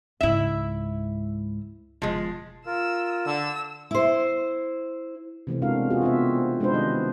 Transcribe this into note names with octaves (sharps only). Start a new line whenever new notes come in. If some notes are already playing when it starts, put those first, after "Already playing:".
C#2 G#2 E4 E5
E1 D#3 F3 G#3
F4 A#4 E6
D3 E6
E4 C5
C3 E3 A3 C4
B2 G#3 D4 F#4 A#4 F5
F4 F#4 G#4
B3 C4 F4 E5
G#3 D4 D#4 B4 C5
D#3 G3 D#5